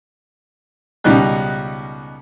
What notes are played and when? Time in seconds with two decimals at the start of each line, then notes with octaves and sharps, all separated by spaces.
1.04 C#2 B2 D#3 G3 D#4 F#6